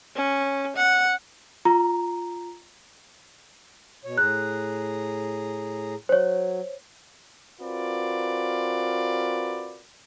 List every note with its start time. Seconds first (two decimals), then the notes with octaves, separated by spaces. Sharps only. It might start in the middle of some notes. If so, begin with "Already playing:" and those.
0.16 C#4
0.77 F#5
1.65 F4 A#5
4.05 B2 C#5
4.18 A2 G#4 A#5 F#6
6.09 F#3 C5 C#5
7.60 C4 F4 F#4 A#4 B4 D5